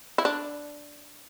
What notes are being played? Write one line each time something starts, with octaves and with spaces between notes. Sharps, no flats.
E4
D4